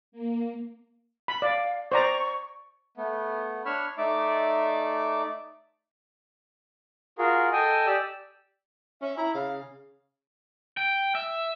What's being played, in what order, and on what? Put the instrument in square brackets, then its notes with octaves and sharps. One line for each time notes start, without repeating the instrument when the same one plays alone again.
[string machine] A#3
[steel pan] B5
[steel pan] D5 [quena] F5
[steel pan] C5 D5 A#5 [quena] C#6
[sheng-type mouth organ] A3 B3
D4 C#5 B5 C#6 E6 F6
A3 D#4 D5 E5 D6
F4 F#4 G#4 A#4
A4 D#5 G5 G#5
G4 D5 E6
[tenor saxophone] C#4 [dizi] E5
[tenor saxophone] E4 [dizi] A#5
[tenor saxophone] C#3 [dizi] F5
[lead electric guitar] G5
E5